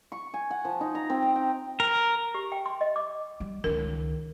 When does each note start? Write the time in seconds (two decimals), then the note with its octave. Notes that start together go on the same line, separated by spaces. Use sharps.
0.12 C#6
0.34 G#5
0.50 F#5
0.65 F3
0.81 D#4
0.95 A#5
1.10 C4
1.22 A#5
1.36 G5
1.80 A#4
2.34 G4
2.52 G5
2.66 C6
2.81 D#5
2.96 D6
3.40 G3
3.64 C#2 D#3 A#4